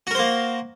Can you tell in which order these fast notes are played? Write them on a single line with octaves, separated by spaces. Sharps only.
F#4 A#4 C5 A#3